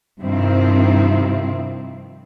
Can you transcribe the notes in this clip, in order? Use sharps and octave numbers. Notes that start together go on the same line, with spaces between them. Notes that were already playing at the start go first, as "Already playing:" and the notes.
G2 C3 D#3 F3 C4 E4